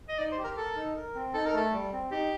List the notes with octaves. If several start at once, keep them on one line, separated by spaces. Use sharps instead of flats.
D#5
D#4 D5
C5
G4
A#4
A4 A#4
D#4
A#4
C4
D#4 A4
A#4
A3 A4
G3
C4
D#4 G4